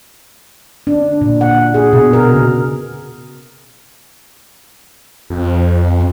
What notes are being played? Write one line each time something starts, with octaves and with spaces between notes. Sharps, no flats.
D4
A#2
F#5
G#4
B2
A#4
C#3
F2